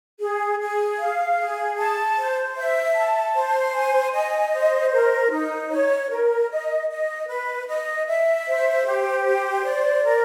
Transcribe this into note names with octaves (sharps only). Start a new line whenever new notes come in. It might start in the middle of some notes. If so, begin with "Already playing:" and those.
G#4
G#4
F5
G#4
A5
C5
E5
A5
C5
G#5
D#5
C5
A#4
D#4
C#5
A#4
D#5
D#5
B4
D#5
E5
C5
G4
C5
D5
A#4